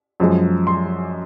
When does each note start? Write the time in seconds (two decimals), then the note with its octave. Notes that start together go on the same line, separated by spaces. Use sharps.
0.20 F#2 F3 G#3
0.67 C6